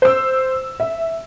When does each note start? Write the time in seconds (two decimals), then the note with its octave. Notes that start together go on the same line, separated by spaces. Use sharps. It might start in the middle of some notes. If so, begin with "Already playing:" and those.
0.02 C5 E6
0.80 E5